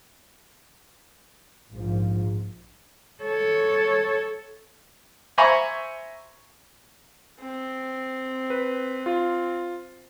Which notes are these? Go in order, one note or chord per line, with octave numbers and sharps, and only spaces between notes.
A#1 G#2 F3
A4 C#5
C5 E5 G#5 A#5 B5 C#6
C4
B4
F4